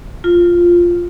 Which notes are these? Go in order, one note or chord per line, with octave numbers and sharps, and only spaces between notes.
F4